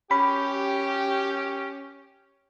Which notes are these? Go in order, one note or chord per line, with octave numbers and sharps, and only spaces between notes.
C#4 G4 B5